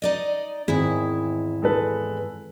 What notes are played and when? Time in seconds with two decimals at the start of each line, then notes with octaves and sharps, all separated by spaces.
0.02 D#4 D5 D#5
0.68 E2 G#2 D#3 C4 E4 G#4
1.62 G#3 A4 B4